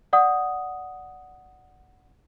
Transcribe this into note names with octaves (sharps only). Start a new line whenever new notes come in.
D5 F#5 D#6